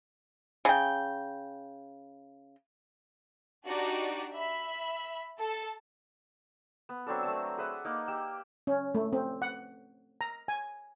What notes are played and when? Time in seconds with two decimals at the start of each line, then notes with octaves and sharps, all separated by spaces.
0.65 C#3 G5
3.66 D4 D#4 F#4 G4 D5
4.34 E5 B5
5.40 A4 A5
6.89 B3
7.06 F#3 C4 D4 A4
7.23 A3 A5 E6
7.58 G#4 B4 E5 F#5
7.85 A#3 D#4 D6
8.08 G4 E6
8.67 C#4
8.95 A3
9.13 C4
9.42 F#5
10.21 A#5
10.48 G#5